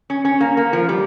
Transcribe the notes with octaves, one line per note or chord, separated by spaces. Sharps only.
C#4
C#4
A#3
A#3
F3
G3